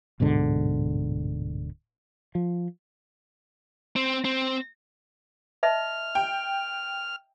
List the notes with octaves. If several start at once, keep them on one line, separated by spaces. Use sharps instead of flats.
D1 G#2 B2 D3
F3
C4
C4
D#5 E5 A5 F6
G5